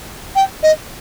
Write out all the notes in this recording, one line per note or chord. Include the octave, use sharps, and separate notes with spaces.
G5
D#5